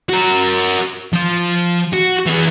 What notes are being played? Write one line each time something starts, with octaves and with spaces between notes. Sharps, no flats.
F#4 A#4
F3 F5
F#4
E3 G#4